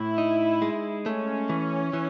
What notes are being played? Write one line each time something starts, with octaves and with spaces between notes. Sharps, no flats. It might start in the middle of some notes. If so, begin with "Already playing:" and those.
Already playing: A2 E4
D#4
G#3
A3 C#4
E3
E3